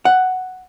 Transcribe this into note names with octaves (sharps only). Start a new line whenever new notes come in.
F#5